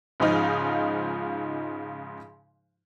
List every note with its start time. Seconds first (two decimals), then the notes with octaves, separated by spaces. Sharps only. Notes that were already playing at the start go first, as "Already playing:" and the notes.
0.20 G#2 C#3 F3 D#4 F4